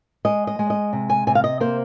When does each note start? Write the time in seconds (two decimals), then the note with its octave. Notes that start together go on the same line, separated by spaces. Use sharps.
0.25 G#3 D#5
0.47 D#5
0.59 G#3
0.70 D#5
0.93 C3
1.10 G#5
1.27 C3 G#5
1.35 F5
1.44 D#5
1.60 A#3 C5